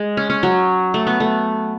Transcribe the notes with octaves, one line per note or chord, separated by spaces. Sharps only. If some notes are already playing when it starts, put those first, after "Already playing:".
Already playing: G#3
C#4
C#4
F#3
A3
B3
A3